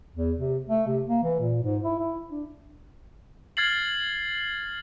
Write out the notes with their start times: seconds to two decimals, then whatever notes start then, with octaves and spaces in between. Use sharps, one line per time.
0.15 E2
0.38 C3
0.69 A3
0.87 C3
1.07 A#3
1.23 E3
1.39 A#2
1.62 G#2
1.83 E4
1.99 E4
2.31 D4
3.57 F6 G#6 A6 C7 F#7